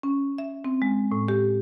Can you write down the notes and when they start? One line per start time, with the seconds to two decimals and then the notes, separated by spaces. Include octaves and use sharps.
0.03 C#4
0.38 E5
0.65 C4
0.82 G#3
1.12 A2
1.28 G4